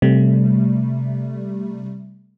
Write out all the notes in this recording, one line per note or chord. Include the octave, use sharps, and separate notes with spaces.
C3 G3 A3